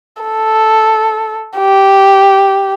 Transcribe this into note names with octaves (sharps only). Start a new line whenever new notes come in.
A4
G4